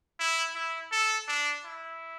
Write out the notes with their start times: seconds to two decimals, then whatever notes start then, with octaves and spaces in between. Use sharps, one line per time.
0.19 E4
0.55 E4
0.92 A4
1.28 D4
1.64 E4